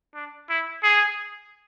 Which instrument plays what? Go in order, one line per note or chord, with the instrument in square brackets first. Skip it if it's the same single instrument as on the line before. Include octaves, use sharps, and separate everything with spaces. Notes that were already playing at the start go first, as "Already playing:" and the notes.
[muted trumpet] D4
E4
G#4